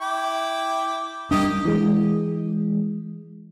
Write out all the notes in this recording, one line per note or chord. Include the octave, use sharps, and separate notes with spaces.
E4 G5 D6
G3 A#3 D4 G4 D#5
E3 G#3